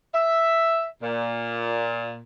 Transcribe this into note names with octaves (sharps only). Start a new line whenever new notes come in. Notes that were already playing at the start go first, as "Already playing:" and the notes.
E5
A#2